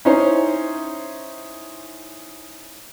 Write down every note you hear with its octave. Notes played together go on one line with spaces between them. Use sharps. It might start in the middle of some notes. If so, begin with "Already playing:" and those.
C#4 D#4 E4 C5 C#5